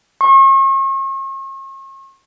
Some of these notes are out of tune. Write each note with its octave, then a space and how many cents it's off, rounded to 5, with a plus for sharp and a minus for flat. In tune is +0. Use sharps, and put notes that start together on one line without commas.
C#6 -40